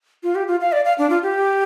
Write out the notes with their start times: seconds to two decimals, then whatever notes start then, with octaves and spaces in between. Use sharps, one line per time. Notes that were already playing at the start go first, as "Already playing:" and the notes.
0.23 F4
0.35 G4
0.48 F4
0.61 F5
0.72 D5
0.85 F5
0.98 D4
1.10 F4
1.23 G4